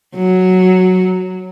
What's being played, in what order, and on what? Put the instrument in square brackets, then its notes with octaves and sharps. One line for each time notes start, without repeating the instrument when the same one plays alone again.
[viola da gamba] F#3